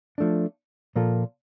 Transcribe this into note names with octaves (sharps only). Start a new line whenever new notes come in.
F3 A3 D4
A#2 F3 A#3 F4 A4